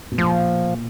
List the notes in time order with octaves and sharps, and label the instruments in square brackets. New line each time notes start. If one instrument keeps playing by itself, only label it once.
[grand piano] B2
[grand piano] A#2 [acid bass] F3